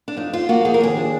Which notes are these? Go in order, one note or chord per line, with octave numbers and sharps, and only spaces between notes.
D4
F2 D#4
F2 F4
A#3 F#4
F3 G#4
A#4
D#2 G#4
D4